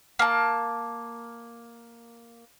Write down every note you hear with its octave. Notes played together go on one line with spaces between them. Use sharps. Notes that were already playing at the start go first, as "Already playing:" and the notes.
A#3 A5